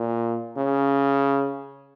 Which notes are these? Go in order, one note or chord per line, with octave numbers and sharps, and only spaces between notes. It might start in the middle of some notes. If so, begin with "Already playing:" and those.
Already playing: A#2
C#3